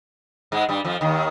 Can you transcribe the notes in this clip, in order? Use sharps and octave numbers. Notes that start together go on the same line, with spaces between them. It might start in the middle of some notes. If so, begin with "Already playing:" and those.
G#2 G#3
G2 G3
F2 F3
D#2 D#3